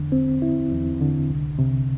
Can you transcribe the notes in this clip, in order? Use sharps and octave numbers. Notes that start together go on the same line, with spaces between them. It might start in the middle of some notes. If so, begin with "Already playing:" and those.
Already playing: E2 D3
C4
E4
E2
D3
C2
C3